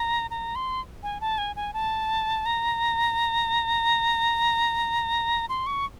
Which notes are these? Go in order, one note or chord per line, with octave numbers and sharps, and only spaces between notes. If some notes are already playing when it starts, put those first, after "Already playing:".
Already playing: A#5
A#5
C6
G#5
A5
G#5
G#5
A5
A#5
C6
C#6